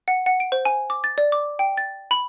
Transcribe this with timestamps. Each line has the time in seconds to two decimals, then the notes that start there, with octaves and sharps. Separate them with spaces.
0.08 F#5
0.26 F#5
0.40 D7
0.52 C5
0.65 G#5
0.90 D6
1.04 A6
1.18 D5
1.32 D6
1.59 G5
1.77 A6
2.11 B5